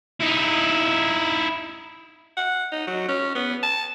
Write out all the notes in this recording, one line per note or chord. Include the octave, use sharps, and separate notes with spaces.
D#4 E4
F#5
D#4
F#3
C#4
B3
A5